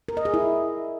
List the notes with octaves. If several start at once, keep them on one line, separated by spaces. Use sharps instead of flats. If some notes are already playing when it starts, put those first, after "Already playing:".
A#4
D#5
G#4
E4